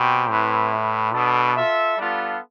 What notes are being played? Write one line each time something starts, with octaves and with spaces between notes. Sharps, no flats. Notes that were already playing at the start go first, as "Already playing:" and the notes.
Already playing: B2 C4 G4 C5 G5
A2 C4 E4 B4
E4 B4 E5
B2 B3 D4 A4
F4 A4 E5
G3 B3 D4 F4 A4